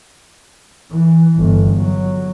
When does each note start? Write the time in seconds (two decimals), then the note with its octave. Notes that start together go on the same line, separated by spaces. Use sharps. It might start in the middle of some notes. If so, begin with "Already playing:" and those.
0.90 E3
1.36 G1
1.78 F#3